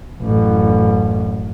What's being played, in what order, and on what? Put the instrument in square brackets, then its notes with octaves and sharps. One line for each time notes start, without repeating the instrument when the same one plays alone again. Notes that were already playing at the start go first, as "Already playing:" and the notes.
[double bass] A1 F#2